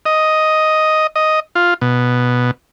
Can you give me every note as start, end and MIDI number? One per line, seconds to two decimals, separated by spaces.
0.06 1.07 75
1.16 1.40 75
1.55 1.74 65
1.81 2.51 47